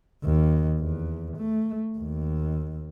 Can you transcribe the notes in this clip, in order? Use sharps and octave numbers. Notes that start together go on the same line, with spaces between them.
D#2
E2
A3
D#2